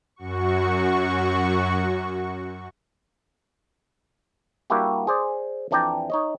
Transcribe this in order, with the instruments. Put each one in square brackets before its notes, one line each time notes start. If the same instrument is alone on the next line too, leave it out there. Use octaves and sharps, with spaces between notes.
[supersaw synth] F#2 F#4 C#6
[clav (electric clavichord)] G3 A#3 D4 E4 F#4 G4
G#4 C5 D5
F2 E3 D4 D5 G5 A#5
D#4 C#5 D#5